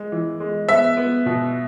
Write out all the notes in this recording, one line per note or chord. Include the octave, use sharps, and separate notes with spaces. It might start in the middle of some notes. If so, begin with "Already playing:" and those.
Already playing: G#3
E3
G#3
B3 E5
B3
B2